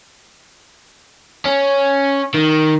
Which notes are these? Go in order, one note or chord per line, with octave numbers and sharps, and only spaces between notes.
C#4
D#3